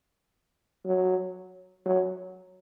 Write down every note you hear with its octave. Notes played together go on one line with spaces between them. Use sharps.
F#3
F#3